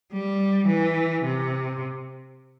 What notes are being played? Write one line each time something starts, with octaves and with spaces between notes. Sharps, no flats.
G3
E3
C3